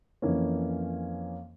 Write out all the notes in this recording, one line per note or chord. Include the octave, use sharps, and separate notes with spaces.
F2 E3 A#3 C#4